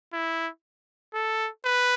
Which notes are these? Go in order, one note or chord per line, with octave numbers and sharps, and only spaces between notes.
E4
A4
B4